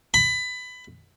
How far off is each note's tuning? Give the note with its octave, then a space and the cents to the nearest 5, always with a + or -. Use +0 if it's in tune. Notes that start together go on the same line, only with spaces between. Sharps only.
B5 +20